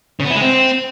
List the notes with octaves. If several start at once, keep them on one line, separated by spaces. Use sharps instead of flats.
C#3
B3
E4
G#3
C4